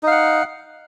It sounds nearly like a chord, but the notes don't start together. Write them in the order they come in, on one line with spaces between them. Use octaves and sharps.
D#4 F5 F#5